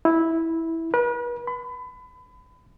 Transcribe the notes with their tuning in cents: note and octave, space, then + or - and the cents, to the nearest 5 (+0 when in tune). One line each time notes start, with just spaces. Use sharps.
E4 -10
B4 -40
B5 +30